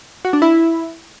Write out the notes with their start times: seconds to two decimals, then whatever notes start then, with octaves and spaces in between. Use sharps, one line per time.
0.25 F#4
0.33 D4
0.42 E4